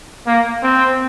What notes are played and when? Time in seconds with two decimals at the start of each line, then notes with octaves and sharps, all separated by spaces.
0.27 A#3
0.63 C4